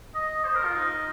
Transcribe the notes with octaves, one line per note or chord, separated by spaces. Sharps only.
D#5
C5
A#4
F4
D#4